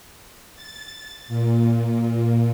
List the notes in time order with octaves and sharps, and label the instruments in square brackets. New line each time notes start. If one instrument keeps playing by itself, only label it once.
[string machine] A6
A#2